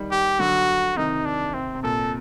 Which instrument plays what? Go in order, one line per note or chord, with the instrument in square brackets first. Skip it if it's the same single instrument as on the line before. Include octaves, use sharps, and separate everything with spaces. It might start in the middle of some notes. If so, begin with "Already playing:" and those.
Already playing: [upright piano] D#3 G3
[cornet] G4
[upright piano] D3 F#3 [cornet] F#4
[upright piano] C3 D#3 [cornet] D#4
[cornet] D4
[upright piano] C3 [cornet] C4
[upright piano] C3
[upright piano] A#2 [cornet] A4